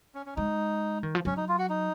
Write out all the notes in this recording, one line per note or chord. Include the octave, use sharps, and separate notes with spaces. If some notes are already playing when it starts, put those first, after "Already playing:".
C#4
C#4
G#3 D#4
D#3
F3
F#3 C#4
D#4
F4
F#4
D#4